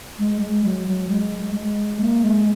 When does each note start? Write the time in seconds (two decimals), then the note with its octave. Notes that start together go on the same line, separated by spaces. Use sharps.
0.19 G#3
0.41 G#3
0.64 F#3
0.87 F#3
1.10 G#3
1.55 G#3
2.01 A#3
2.24 G#3